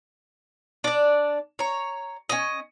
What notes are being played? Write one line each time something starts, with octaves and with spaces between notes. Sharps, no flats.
D4 D5
C#5 A#5
C#4 D#5